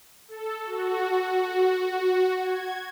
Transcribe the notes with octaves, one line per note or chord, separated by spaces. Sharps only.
A4
F#4
F#4
F#4
G#6